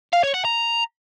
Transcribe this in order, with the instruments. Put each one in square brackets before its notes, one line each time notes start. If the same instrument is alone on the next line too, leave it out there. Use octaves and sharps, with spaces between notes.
[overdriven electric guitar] F5
C#5
F#5
A#5